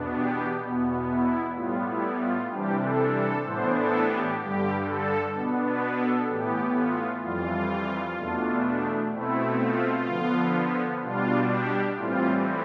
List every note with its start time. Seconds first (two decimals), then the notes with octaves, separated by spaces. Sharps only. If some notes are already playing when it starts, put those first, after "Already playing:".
Already playing: E2 B2 B3 D4
0.13 G4
0.61 E2 B2 B3
1.09 E4
1.55 A2 G3 B3 F4
1.87 E4
2.19 F4
2.50 C3 E3 G3 D4 G4
2.82 A4
3.14 A4
3.44 A2 E3 B3 D4 C5
3.77 A4
4.08 G4
4.39 G2 D3 G3 G4
4.86 A4
5.34 B2 B3 D4
5.66 B4
5.98 A4
6.28 A2 E3 B3 G4
6.76 F4
7.23 F2 E3 G3 F4
8.18 E2 B2 A3 D4
9.13 B2 A3 C4 E4
9.60 F4
10.07 D3 F3 B3
11.02 B2 G3 D4 F4
11.49 G4
11.96 A2 E3 G3 C4 F4